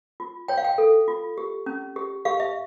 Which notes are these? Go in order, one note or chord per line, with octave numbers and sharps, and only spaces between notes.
F4
C#5 G5
F5
G5
A4
F4
G4
C#4
G4
G4 F5
E5